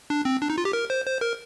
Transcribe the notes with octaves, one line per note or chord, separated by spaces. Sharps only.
D4
C4
D4
D#4
F4
G4
A#4
C5
C5
A#4